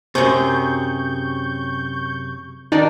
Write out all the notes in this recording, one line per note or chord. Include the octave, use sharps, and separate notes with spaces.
F#2 C3 G#4 C#6 G6
D#3 D4 D#4 D5